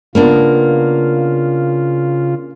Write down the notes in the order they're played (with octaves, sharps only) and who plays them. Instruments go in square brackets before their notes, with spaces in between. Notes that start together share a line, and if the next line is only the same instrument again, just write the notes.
[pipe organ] C#3 F4 [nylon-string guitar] A#3 B3 D4